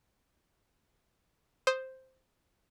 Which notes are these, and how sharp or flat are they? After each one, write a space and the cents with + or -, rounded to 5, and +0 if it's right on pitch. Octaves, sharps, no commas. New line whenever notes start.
C5 +0 D#6 +0